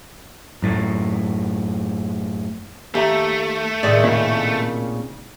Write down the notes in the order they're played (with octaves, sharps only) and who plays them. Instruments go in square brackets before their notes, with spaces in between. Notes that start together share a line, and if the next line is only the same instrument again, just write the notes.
[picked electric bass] F#2 A2
[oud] D#2 [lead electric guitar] A3 [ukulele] G4 E5 A#5
[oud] A2 C3 D#3 [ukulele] G#4 C5 D5
[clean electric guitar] A#2 C#3 [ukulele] C#4